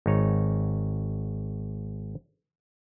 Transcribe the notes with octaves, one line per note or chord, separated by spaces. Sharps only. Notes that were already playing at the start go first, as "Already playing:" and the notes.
G#1 D#4 C#5